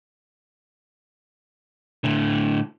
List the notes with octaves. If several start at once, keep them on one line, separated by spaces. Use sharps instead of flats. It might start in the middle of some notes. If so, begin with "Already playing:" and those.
A2 D3